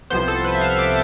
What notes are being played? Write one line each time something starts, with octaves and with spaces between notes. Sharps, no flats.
C2 C3 F3 B3 C5
A4
B4
E5
F5
D6